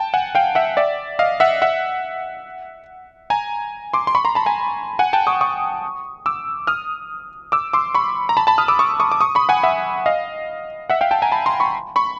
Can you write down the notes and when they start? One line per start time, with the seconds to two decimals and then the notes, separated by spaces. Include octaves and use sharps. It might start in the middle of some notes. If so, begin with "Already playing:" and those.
Already playing: G5 A5
0.14 F#5 G#5
0.35 F5 G5
0.55 E5 F#5
0.77 D5 E5
1.19 D#5 F5
1.40 E5 F#5
1.62 E5 F#5
3.30 G#5 A#5
3.93 C6 D6
4.07 C6
4.15 B5 C#6
4.25 A#5 C6
4.35 A5 B5
4.46 G#5 A#5
4.99 F#5 G#5
5.13 G5 A5
5.27 C#6 D#6
5.41 C#6 D#6
6.26 D6 E6
6.67 D#6 F6
7.52 D6 E6
7.73 C6 D6
7.95 B5 C#6
8.29 A#5
8.37 A5 B5
8.47 A5 B5
8.58 D#6 F6
8.68 D6 E6
8.79 C#6 D#6
9.00 C#6 D#6
9.12 D6
9.21 C#6 D#6
9.35 B5 C#6
9.49 F#5 G#5
9.63 E5 F#5
10.06 D#5 F5
10.90 E5 F#5
11.01 F5 G5
11.11 G5 A5
11.22 G#5 A#5
11.32 A5 B5
11.46 A#5 C6
11.60 B5 C#6
11.96 B5 C#6